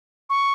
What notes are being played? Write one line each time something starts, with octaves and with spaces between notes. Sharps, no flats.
C#6